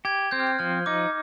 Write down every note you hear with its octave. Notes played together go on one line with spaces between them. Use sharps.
G4 G#6
C4 G6
F6
G6
F3 F6
D#4 D6